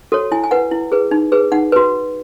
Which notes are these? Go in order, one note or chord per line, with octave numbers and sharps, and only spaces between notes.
F#4 A4 C#5
E4 G#5
G#5
B4 F#5
E4
G#4 B4
D#4
G#4 B4
D#4 F#5
F#4 B4